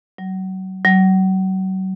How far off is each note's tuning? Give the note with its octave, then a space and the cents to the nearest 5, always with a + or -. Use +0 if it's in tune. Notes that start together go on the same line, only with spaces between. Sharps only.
F#3 +30
F#3 +35